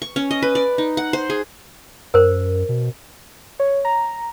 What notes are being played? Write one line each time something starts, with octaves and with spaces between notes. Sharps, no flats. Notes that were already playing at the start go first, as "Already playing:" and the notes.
C#6
C#4
D#5
B4
D5
D#4
F#5
C5
G#4
F#2 A#4 C5
B2
C#5
A#5